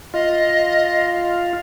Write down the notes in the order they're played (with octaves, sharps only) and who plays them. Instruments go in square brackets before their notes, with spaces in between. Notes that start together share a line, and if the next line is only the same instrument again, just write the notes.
[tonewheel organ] F4 [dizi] D#5